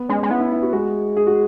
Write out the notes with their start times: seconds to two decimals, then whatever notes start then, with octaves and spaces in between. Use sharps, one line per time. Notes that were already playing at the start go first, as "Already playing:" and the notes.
Already playing: B3
0.09 G#3 C#4
0.23 G#3
0.30 B3 E4
0.40 E4
0.52 E4
0.63 F#4
0.73 G#3 F#4
1.17 G#4
1.27 F#4